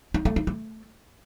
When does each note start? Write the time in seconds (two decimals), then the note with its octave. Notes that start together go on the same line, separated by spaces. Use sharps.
0.14 D#4
0.25 A3
0.36 D#4
0.47 A3